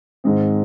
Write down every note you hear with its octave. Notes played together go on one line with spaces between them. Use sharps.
G#2 D#3 G#3 C4